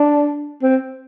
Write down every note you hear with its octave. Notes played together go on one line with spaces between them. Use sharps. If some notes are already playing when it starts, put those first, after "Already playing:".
Already playing: D4
C4